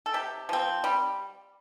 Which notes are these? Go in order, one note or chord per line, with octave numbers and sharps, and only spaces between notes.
A4
C3 G4
F3 C4
G3